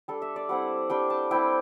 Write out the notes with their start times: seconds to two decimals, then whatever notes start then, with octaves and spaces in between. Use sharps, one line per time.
0.08 G3 D4 A4
0.22 E5
0.36 D5
0.49 G3 C4 E4 F#5
0.90 G3 D4 G5
1.10 A5
1.31 G3 C4 E4 G5